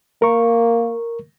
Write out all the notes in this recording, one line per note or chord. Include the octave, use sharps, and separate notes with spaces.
A#3 A#4 C#6